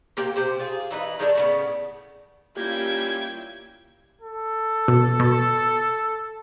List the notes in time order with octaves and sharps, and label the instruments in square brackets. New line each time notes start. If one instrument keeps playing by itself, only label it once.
[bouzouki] C3 A#3 G4 G5
C3 G4 C5
F4 G#4
E3 D#4 E4 B4
D#3 G#3 D4 A4
A2 C#3 B3
[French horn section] G3 C#4 F4 [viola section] A#3 E4 G5 [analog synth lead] G4 [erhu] G#6
[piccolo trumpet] A4
[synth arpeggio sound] B2
B2